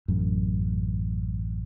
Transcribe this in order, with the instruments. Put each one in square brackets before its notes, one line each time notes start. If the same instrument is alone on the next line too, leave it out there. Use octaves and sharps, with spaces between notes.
[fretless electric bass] A1 F#2